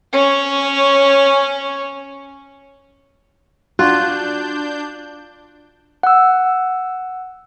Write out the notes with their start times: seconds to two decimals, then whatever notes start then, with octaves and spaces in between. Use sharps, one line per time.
0.13 C#4 C#5
3.79 D4 F4 F#4 F#6 G6
6.03 F#5 E6